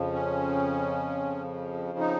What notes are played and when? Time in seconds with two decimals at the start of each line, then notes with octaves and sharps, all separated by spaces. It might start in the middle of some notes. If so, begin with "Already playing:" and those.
Already playing: F2 C#3 F3
0.13 C#4
1.98 D#4